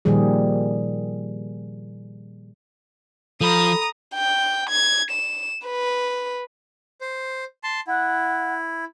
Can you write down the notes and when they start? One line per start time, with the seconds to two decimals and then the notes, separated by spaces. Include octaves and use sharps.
0.05 A#2 D#3 F3 G3 G#4
3.41 F3 A4 A#5 B5 D#6
4.15 G5
4.70 G#6
5.11 E7
5.66 B4
7.01 C5
7.63 A5 C6
7.87 E4 F#5